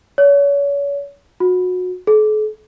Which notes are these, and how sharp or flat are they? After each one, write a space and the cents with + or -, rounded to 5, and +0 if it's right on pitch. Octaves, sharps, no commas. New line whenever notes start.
C#5 +35
F#4 -25
A4 -45